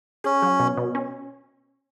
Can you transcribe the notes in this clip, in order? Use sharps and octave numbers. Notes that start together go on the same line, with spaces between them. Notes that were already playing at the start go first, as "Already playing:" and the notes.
C#4 G#4
F#3
B2
B2
C#4